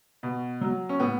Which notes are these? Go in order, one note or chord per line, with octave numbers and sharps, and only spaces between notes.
B2
F#3
C#4
A2 B3